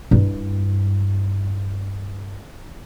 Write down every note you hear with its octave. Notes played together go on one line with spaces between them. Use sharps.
G2 E4